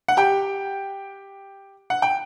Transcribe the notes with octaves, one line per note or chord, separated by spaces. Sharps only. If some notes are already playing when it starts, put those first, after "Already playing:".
F#5
G4 G5
F#5
G5